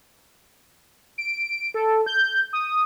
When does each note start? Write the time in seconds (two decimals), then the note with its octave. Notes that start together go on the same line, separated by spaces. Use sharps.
1.18 D7
1.74 A4
2.06 G6
2.53 D#6